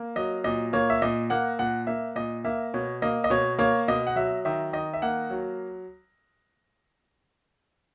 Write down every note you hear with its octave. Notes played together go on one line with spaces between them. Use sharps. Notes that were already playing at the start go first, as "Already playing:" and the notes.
Already playing: A#3
F#3 D#5
A#2 D#5
A#3 C#5
E5
A#2 D#5
A#3 F#5
A#2 F#5
A#3 E5
A#2 D#5
A#3 E5
B2 C#5
A#3 D#5
D#5
B2 C#5
A#3 C#5
B2 D#5
F#5
F#3 E5
D#3 E5
D#3 D#5
E5
A#3 F#5
F#3